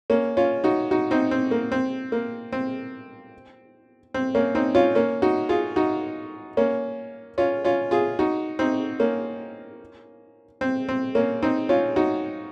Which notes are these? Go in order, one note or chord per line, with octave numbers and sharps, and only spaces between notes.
A#3 C#4
C#4 F4
D#4 F#4
D#4 F#4
C4 D#4
C4
A#3
C4
A#3
C4
C4
A#3 C#4
C4 D#4
C#4 F4
A#3 C#4
D#4 F#4
F4 G#4
D#4 F#4
A#3 C#4
C#4 F4
C#4 F4
F4 G#4
D#4 F#4
C4 D#4
A#3 C#4
C4
C4
A#3 C#4
C4 D#4
C#4 F4
D#4 F#4